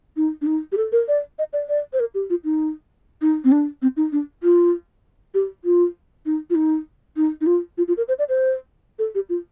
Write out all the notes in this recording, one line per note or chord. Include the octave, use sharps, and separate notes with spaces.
D#4
D4
D#4
G4
A4
A#4
D5
D#5
D5
D5
C5
A#4
G4
F4
D#4
D#4
C4
D4
C4
D#4
D4
F4
G4
F4
D#4
F4
D#4
D#4
D#4
F4
F4
F4
A#4
C5
D5
C5
A4
G4
F4